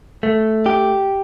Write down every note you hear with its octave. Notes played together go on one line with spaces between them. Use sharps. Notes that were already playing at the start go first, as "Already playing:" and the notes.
A3
G4